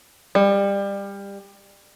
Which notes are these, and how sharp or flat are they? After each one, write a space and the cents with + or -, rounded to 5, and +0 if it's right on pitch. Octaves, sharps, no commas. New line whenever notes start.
G3 +25